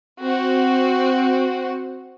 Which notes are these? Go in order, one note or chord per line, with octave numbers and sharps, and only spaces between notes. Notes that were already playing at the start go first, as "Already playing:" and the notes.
C4 F#4